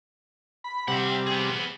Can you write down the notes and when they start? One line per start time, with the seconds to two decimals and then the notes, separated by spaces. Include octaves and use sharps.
0.64 B5
0.88 C3 G3 E5 F#5
1.27 B3 G#4